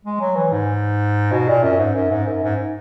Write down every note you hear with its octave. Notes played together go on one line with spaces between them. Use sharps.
G#3
F#3
E3
G#2
B2
A#2
F#2
G#2
F#2
G#2
F#2
G#2